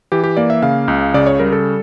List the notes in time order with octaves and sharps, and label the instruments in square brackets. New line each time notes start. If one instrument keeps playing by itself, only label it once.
[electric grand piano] E3 G4
G4
A#3 D5
E5
C#3 F5
C#2
C#3 D5
C#5
G3 A#4
A4